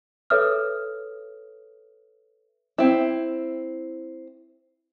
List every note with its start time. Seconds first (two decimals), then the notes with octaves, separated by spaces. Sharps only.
0.30 A4 B4 C#5 E5 D#6 F6
2.78 C4 E4